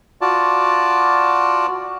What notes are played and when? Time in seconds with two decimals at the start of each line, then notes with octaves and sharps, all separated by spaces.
0.21 F4 F#4 D5 A5